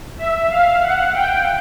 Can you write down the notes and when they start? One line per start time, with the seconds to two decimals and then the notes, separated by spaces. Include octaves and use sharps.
0.18 E5
0.49 F5
0.82 F#5
1.13 G5